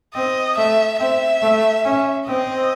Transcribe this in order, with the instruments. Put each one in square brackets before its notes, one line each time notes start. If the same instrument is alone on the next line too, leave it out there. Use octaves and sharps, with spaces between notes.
[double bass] C4 [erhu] D#5
[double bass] A3 [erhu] E5
[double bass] C4 [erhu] E5
[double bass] A3
C#4
[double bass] C4 [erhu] D#5